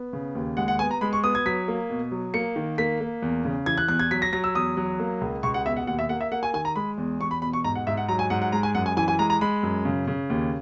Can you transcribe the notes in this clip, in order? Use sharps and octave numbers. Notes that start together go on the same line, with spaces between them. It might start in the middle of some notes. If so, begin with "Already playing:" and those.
Already playing: B3
C#3
D#2
G#3 F#5
F#5
B3 G#5
A#5
G#3 B5
C#6
B3 D#6
G#6
F#3 B6
A#3
B2
F#3
A#3 C#7
D#3
A#3 B6
A#3
E2
C#3
E3 G#6
F#6
E2 F#6
G#6
F#3 B6
A#6
F#3 A#6
E6
E2 D#6
F#3
A#3
C#2
C#2 C#6
F#5
B2 E5
F#5
D#2 F#5
E5
A#3 F#5
E5
A#3 F#5
G#5
D#3 G#5
A#5
G#3 B5
E2
E2 C#6
B5
B2 B5
C#6
G#2 A#5
F#5
G#2 E5
F#5
F#3 A#5
G#5
G#2 F#5
F#5
G#3 A#5
G#5
F#2 F#5
G#5
E3 G#5
G#5
G#3 A#5
A#5
G#3 B5
F#2
C#3
C#3
D#2